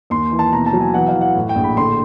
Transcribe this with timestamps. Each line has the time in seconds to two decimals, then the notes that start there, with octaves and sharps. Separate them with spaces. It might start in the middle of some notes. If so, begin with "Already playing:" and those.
0.10 D#2 C6
0.32 E3
0.39 A5
0.52 B2 A#5
0.66 A5
0.73 F#3
0.80 G#5
0.94 E3 F#5
1.08 F5
1.14 E3
1.21 F#5
1.36 A2
1.49 G5
1.56 A#1
1.64 B5
1.77 D3 C6